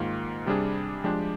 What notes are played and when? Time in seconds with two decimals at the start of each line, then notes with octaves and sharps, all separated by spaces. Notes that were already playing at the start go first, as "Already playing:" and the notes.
Already playing: G#2 D#3 A#3 F4
0.46 C3 G3 D4 G#4
1.04 F3 G#3 D4 G4